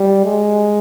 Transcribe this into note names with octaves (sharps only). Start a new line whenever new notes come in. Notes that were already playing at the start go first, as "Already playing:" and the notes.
Already playing: G3
G#3